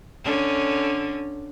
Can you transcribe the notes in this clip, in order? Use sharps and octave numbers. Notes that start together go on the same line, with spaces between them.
D3 C#4